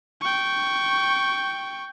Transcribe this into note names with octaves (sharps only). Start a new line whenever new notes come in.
G5 C#6